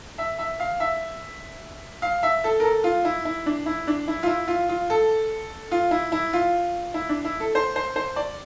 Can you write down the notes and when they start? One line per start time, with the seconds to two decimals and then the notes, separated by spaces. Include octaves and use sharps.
0.18 E5
0.39 E5
0.60 F5
0.80 E5
2.02 F5
2.23 E5
2.44 A4
2.60 A#4
2.63 A4
2.84 F4
3.05 E4
3.25 E4
3.46 D4
3.66 E4
3.87 D4
4.08 E4
4.23 F4
4.27 E4
4.48 F4
4.69 F4
4.90 A4
5.71 F4
5.91 E4
6.12 E4
6.33 F4
6.94 E4
7.09 D4
7.25 E4
7.40 A4
7.55 C5
7.76 C5
7.96 C5
8.16 D5